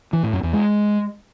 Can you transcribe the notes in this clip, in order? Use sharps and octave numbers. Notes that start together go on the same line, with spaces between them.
E3
A2
F#2
E2
G#3